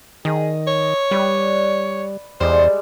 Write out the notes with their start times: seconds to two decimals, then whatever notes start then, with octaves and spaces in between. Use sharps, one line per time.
0.25 D#3 G#4 D#5
0.67 C#5
1.11 G3 B4 D5
2.40 E2 G3 G#3 C5